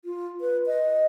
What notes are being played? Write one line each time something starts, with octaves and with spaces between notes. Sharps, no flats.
F4
B4
D#5